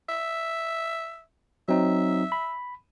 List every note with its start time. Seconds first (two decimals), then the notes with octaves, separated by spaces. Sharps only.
0.09 E5
1.68 F#3 C4 D#4 E5
2.32 B5